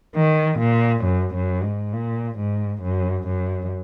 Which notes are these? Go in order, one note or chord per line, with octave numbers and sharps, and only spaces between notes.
D#3
A#2
F#2
F#2
G#2
A#2
G#2
F#2
F#2